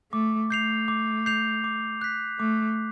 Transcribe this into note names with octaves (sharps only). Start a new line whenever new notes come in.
A3 D6
A3 G6 C7 F7
D6
G6 C7 F7
D6
F#6 B6
A3 D6